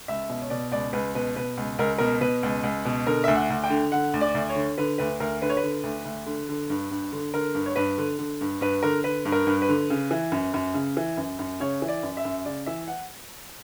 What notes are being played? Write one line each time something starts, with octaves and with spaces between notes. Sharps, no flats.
C#2 E5
B2
C#5
B2 D5
C#2 D5
C#2 B4
B2 B4
B2 B4
C#2
C#2 A#4
B2 A#4
B2 B4
C#2
C#2
B2
D3 A#4
D2 E5
F#5
D2
G5
D3
D3 F#5
D2
D5
D2
C#5
D3
D3 B4
D2 B4
D2 A#4
D3 B4
C#5
B4
D3
D2
D2
D3
D3
G2
G2
D3
D3 A#4
G2
C#5
G2 B4
D3
D3
G2
G2 B4
D3 A#4
D3 B4
G2
A#4
G2
B4
D3
C#3
E3
F#2
F#2
C#3
E3
F#2
F#2
C#3 C#5
E3
D5
F#2
E5
F#2
C#3 D5
E3 E5
F#5